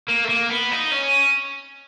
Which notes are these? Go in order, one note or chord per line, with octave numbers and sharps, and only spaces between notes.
A#3
A3
A#3
B3
D#4
C#4